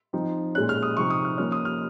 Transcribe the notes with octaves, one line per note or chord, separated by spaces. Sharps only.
F3 C4 D#4
A#2 G#3 C#4 F#6
F6
D#6
C3 F3 C4 D#4 C#6
D#6
F6
F3 A#3 C#4 F6
D#6
F6